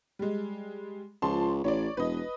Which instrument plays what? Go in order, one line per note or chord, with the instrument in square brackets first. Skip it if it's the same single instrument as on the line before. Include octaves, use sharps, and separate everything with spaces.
[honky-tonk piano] G3 G#3
[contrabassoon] C#2 [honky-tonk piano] F3 A5 C6
[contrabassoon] A1 [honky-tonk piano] C#5 D5
[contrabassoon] E1 [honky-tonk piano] B4 D#5